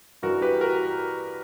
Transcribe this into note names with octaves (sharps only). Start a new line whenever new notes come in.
G2 E3 F#4 A#4
G4 B4
F#4 A#4